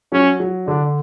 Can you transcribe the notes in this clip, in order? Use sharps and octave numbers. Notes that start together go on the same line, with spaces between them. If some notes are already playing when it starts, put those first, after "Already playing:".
F#3 C#4
F#3
D3 D4